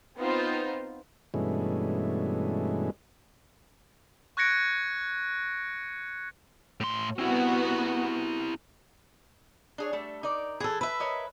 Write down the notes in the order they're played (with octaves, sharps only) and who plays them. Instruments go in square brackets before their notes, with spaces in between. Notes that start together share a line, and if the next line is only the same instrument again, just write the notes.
[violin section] B3 C4 D#4 F4 C5
[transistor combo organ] G2 B2 E3 G#3 A3 C#4
[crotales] C#6 F#6 G#6 A#6 C#7 D7
[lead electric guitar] A2 C6
[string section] B3 F#4 [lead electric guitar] C4 E4
[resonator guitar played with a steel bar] D4 G#4 C#5
G3 A3 A4
D#4 A#4 D5
[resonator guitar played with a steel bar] E3 [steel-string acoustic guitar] G#4 A4
[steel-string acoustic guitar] B4 E5
[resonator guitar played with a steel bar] A#4 C#5 D#5